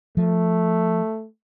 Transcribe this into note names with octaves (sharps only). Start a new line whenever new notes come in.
F3 A3